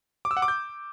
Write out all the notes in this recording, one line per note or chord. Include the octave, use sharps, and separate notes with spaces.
D6
E6
F#5
D6
G6